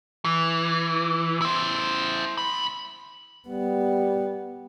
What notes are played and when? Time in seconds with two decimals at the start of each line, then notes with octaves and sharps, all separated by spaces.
0.25 E3
1.42 E4 C5
2.38 D2 B5
3.48 G3 B3